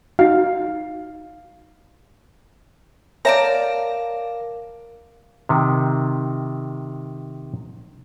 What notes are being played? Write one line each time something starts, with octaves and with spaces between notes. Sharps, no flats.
D#4 F#4 F5
A#4 C#5 D5 E5 F5 A5 A#5
C3 D#3